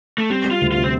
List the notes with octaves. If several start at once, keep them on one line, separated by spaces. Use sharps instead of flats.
A3
G3 C4
G3
F4
D2
C3 F4
C4